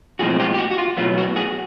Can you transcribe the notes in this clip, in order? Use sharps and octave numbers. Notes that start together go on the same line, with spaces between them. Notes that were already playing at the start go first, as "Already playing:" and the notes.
B1 A2 F3 G#3 C4 F#4 G#4
F4 G4
G4
F#4
F#4
F4
B1 A2 F#3 B3 F4
F#4
F#4 G#4